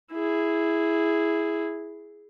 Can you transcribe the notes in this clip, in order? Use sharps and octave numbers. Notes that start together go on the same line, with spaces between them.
E4 G#4